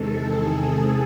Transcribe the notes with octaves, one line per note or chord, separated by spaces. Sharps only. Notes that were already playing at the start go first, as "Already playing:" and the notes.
Already playing: E2 C3 D#3 G#3 A4
G#4
A4